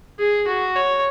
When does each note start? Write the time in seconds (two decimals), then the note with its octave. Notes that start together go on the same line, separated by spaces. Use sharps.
0.19 G#4
0.47 F#4
0.75 C#5